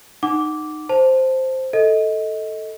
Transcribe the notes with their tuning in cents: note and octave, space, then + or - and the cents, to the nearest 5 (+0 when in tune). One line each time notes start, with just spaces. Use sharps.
D#4 -20 F#5 +10 D6 -10
C5 +0 A5 +0
A4 +0 D#5 +20